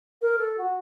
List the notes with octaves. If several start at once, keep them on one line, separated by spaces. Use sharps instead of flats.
A#4
A4
F#4